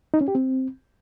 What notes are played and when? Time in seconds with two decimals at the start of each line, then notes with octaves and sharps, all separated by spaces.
0.14 D#4
0.21 C#4
0.28 G4
0.35 C4